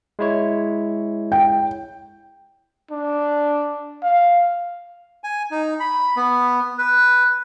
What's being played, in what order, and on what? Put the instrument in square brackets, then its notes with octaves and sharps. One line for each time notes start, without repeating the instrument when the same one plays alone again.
[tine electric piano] G#3 E4 C#5
[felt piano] G5
[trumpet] D4
F5
[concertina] G#5
D#4
B5
B3
B4